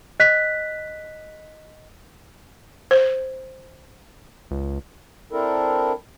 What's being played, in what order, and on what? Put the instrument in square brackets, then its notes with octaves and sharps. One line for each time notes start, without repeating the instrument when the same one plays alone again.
[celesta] D#5 F#6 B6
[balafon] C5
[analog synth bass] C#2
[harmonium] C4 D4 E4 A4 A#4